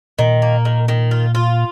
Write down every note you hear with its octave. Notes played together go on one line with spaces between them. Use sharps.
A#2 D#3
A#3
D#3
D#3
F4
F4